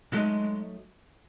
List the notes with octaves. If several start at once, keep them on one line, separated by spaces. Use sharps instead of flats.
F#3 G#3 A3 D#4